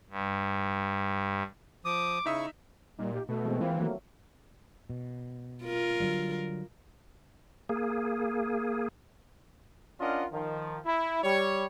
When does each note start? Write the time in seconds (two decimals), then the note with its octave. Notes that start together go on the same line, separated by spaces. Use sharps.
0.10 G2
1.85 F3 D6 D#6
2.26 C#3 D#4 E4 E5 C#6 D#6
2.99 A#2 G3 D#4
3.13 G4
3.28 B2 A3
3.44 E3 G#3 C4
3.60 E3 A#3 C4 F4
3.77 D#3 F#3 A3 A#3
4.90 B2
5.64 F4 A#4
6.00 D3 F#3 G3
7.69 A#3 G#4
9.99 C#4 D4 F4 A#4 D#5 F#5
10.32 D#3 F3
10.86 E4
11.24 G3 C#5